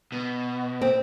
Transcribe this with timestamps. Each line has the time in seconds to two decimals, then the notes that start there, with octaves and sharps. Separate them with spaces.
0.12 B2
0.81 C4